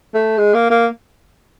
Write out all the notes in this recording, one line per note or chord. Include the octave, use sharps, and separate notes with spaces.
A3
G#3
A#3
A#3